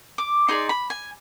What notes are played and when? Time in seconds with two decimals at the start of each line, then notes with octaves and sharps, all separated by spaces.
0.18 D6
0.48 D#4 G#4 D5 C6
0.69 B5
0.90 G#5